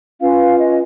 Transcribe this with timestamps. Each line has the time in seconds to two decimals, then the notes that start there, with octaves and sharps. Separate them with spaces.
0.20 C#4 F4 B4 F5
0.58 D#5